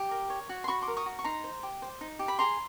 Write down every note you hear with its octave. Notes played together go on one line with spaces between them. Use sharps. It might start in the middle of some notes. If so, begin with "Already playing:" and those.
Already playing: G4
A#4
C#5
F#4
C6
F#4 B5 C#6
C6 D6
A#4
C#6 D#6
F#4
C#6
D#4 A#5 C6
C5
G4
C5
D#4
G4
B5
G#4 A#5 C6